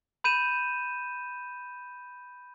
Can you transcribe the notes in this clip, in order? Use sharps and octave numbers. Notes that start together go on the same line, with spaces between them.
B5 G6 D#7 E7